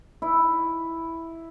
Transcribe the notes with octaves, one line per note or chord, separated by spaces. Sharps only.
E4